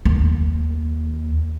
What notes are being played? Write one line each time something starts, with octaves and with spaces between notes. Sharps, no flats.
D#2